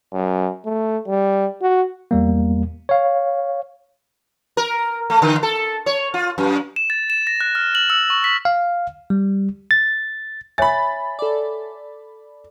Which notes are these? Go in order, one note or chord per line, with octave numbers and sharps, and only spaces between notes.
F#2
A3
G3
F#4
E2 G3 A#3
C#5 F5
A#4
A3
D3
A4
C#5
F4
F#2
E7
A6
E7
A#6
F#6
F6
F#7
E6
C#6
B6
F5
G3
A6
C#5 E5 G#5 B5 A6
A4 D5